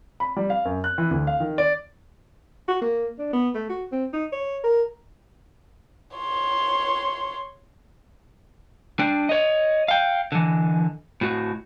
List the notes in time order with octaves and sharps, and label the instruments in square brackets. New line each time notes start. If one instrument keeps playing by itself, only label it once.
[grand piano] B5
G3
F5
F#2
F#6
E3
D2
F5
D#3
D5
[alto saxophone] F#4
A#3
D4
B3
A3
F#4
C4
D#4
C#5
A#4
[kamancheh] C#5 C6
[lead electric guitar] D4 G5
C#5 D#5
F5 G5
D3 E3
A2 F#4